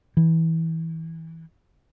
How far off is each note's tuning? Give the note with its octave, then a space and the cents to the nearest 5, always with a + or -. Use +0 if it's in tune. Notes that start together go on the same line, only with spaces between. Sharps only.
E3 -20